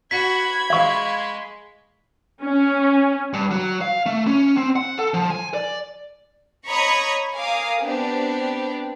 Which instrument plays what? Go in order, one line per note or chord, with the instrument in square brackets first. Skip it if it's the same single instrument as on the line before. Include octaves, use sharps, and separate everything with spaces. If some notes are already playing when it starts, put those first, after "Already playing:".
[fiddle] F#4 [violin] B5 G#6 [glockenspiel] B6
[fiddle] G#3 [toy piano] F5 C#6
[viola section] C#4
[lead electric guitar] G2
F#3
F5
A3
C#4
C4
F#5
A4
F3
G#5
D5
[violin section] C#5 D#5 A#5 B5 C#6 D#6
A#4 F5 G#5 D6 D#6
B3 C4 D4 G4